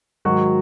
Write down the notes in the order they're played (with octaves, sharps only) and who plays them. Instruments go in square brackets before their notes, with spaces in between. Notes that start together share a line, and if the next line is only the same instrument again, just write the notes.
[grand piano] G#2 D#3 F#3 F#4